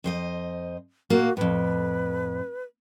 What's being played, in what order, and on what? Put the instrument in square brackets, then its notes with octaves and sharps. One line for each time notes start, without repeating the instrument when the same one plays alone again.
[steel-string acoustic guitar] F2 C5 D#5
[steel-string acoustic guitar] A#2 A#3 [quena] F#4
[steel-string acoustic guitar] F2 A2 [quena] B4